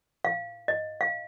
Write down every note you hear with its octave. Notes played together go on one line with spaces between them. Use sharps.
F5
D#5
F5